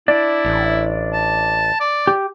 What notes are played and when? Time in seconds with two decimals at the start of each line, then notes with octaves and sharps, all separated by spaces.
0.08 D4 E4 D5
0.45 A1
1.13 A5
1.80 D5
2.07 G4